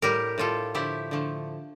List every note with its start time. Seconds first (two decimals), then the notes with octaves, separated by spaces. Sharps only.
0.02 A2 G3 G4 A#4
0.38 A2 G3 F4 A4
0.75 D3 F3 A3 E4 G4
1.11 D3 F3 A3